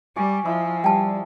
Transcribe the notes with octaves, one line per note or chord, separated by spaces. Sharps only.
G3 D5 G#5 C#6
F3 E4 D5 D#5
G3 G5 A5